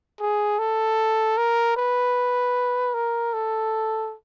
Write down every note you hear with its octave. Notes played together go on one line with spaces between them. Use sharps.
G#4
A4
A#4
B4
A#4
A4